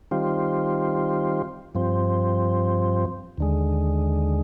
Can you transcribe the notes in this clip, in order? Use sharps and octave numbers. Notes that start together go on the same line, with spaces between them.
D#3 G3 C4 F4
G2 F3 C4
D#2 D3 G#3